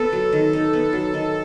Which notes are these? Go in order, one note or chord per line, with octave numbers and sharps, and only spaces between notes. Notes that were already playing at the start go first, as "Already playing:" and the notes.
Already playing: B3 A4
F#3
D#3
D#4
B3
F#3
D#3